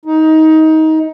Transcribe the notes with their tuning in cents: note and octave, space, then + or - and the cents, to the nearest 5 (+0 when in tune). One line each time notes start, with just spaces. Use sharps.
D#4 +20